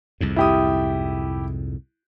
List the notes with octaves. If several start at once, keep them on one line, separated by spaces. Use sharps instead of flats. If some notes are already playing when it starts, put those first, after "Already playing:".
C2 F2 G#2
E4 G4 D#6